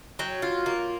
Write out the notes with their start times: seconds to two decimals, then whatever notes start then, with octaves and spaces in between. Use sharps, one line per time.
0.19 F#3 G5
0.42 F4
0.66 A#3